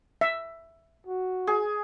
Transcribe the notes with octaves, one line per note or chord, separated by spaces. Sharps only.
E5
F#4
G#4